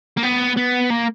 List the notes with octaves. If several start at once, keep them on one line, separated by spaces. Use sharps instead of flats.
A#3
B3
B3
A#3